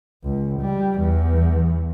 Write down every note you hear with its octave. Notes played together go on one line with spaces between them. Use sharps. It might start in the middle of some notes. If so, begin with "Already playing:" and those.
C#2
G3
E2